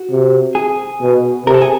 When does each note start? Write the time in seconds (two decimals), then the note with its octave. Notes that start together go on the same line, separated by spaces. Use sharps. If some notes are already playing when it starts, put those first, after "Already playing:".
Already playing: F#4
0.10 C3
0.55 G#4
1.01 B2
1.46 C3 A#4
1.54 A4
1.61 G#4